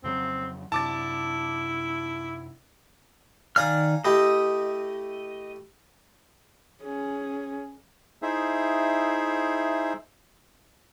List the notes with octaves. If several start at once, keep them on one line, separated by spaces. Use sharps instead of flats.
F2 C#3 F#3 C4
F#2 C3 D4 E4 A5 D6 A6
D#3 D5 F5 G#5 A#5 F6
A3 E4 G4 D#5
C#4 G#4
D#4 E4 G#4 C5 E5